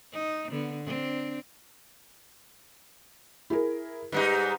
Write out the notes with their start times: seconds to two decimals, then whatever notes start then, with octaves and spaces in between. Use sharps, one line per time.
0.13 D#4
0.52 D3 B3
0.85 C4 D4
3.50 E4 G#4 A#4
4.12 G#2 G3 D#4 B4